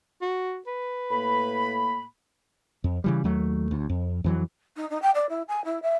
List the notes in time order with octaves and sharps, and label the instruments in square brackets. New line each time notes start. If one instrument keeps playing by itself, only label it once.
[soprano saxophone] F#4
B4
[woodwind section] A2 A#3 B5
[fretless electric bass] F2
C#3 E3 G3
D#2 F#3 A3
D2
F2
F2 E3 F#3
[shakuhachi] D#4
D#4
G5
D5
E4
G#5
E4
E5